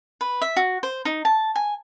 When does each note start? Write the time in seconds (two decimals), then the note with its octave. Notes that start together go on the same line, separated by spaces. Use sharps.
0.21 B4
0.42 E5
0.56 F#4
0.83 C5
1.05 D#4
1.25 A5
1.56 G#5